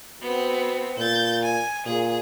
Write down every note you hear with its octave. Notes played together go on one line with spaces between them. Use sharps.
B3 C4 F#4
A#2 G6 A6
G#5
A#2 G#4